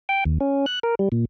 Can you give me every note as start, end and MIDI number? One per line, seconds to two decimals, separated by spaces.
0.09 0.24 79
0.25 0.38 39
0.40 0.66 61
0.66 0.79 90
0.83 0.95 70
0.99 1.09 55
1.12 1.25 46